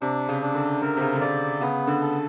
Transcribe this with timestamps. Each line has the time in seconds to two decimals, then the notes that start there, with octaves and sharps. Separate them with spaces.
0.02 C3 D4
0.29 C#3
0.42 D4
0.55 D3
0.82 D3 A#4
0.97 C3
1.01 C#3
1.15 D3
1.21 C#3 D5
1.61 C#3 B3
1.87 D3
2.01 A4